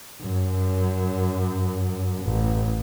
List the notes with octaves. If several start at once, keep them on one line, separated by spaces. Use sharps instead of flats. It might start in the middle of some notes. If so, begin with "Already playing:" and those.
F#2
A1